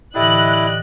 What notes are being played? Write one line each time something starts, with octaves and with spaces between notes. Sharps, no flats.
A2 D3 E3 E4 G4 D5 D#5 F#6